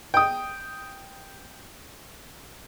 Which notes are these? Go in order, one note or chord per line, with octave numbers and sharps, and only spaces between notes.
G5 D#6